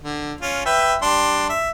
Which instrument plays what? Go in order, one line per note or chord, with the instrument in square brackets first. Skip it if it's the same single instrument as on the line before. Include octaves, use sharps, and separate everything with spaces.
[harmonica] D3
C#4 F4
B4 E5 G5
G3 D4 C6
E5